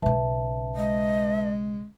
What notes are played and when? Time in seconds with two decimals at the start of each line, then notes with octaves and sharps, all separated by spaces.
0.02 B1 C#3 B4 E5 A5
0.76 G#3 D#5